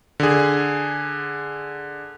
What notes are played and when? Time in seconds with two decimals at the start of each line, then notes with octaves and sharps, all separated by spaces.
0.20 D3 G#4